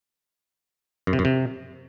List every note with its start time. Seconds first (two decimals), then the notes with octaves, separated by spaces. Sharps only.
1.07 F#2
1.13 C3
1.19 F#2
1.25 C3